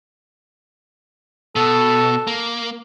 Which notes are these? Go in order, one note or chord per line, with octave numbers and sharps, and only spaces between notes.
B2 A4
A#3